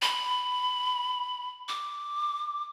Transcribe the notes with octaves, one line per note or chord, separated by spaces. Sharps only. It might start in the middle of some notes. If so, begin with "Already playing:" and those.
B5
D6